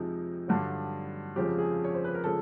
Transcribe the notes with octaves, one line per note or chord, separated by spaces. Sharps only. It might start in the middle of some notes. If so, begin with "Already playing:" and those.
Already playing: F2 C3 F3 G#3 D#4
G2 D3 F#3
F2 C#3 F3 G#3 G4
G#4
C#5
C5
B4
A#4
C#3 F3 G#3 A4